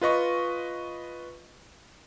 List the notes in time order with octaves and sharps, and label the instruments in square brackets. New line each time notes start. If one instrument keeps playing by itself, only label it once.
[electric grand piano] F4 B4 D#5 C#6